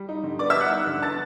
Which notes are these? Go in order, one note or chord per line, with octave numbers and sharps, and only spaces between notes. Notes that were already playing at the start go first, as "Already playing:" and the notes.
Already playing: G3
D#4
D3
B3 D5 D6
E5 E6
G3
F#5 F#6
D#4
D3
B3 A5 A6